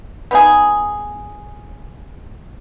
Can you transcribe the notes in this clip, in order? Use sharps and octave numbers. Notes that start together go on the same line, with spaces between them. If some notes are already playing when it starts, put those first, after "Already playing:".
B3 D#4 G#4